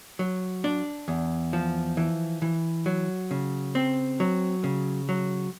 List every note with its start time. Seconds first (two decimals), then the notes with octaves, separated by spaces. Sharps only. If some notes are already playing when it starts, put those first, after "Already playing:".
0.19 F#3
0.64 D4
1.08 E2
1.53 F3
1.97 E3
2.42 E3
2.86 F#3
3.31 C#3
3.75 C4
4.20 F#3
4.64 C#3
5.09 F#3